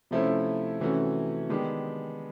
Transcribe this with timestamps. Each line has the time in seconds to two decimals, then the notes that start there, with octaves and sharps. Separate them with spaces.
0.11 C3 F3 A3 C#4 E4
0.80 C3 E3 A3 C#4 F#4
1.50 D#3 G#3 B3 D4 G4